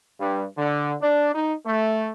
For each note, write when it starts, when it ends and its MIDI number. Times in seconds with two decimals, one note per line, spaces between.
0.20 0.44 43
0.57 0.95 50
1.01 1.29 62
1.34 1.53 63
1.65 2.12 57